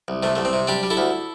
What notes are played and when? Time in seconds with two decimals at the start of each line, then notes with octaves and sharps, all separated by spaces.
0.08 C2
0.23 C3 A3
0.36 C2 A3
0.45 C4
0.53 C3
0.67 G3 D4 G4
0.83 G3
0.90 E4 A4
0.97 D2